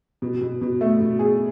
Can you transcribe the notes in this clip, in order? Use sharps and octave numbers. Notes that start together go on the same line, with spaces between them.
B2
B2
B2
A3
B2
G#4